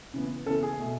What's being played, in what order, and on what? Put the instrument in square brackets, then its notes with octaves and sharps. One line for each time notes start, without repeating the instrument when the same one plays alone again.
[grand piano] C#3 E3 B3
C#3 E3 B3 A4
G#4
B2 A3